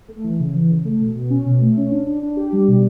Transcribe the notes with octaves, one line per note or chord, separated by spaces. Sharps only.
A3
E3
C#3
E3
C#3
A3
B2
B2
C#4
B2
A3
C#4
D4
D4
D4
G4
G3
B2